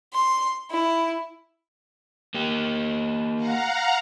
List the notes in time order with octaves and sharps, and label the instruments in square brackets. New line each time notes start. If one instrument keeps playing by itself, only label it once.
[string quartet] C6
E4
[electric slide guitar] A#3 G4
[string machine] F5 F#5 A#5